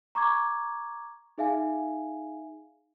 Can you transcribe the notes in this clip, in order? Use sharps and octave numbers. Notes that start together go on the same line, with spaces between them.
A#5 C#6 D6 G#6
D#4 G#4 E5 F5 G#5